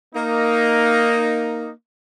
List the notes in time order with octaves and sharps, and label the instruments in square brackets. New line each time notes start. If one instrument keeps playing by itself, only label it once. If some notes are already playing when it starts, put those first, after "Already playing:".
[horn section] A#3 D#4